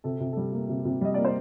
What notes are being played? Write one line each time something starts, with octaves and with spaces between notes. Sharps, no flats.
C3 A4
C3
G3 A4
A#3
C3
C3
G3 D#5
A#3 D5
C5